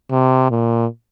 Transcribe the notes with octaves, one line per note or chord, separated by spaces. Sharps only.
C3
A#2